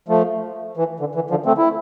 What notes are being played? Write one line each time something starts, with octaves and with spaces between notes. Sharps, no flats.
F3 A3
E3
D3
E3
D3 F3
A3 C4
E4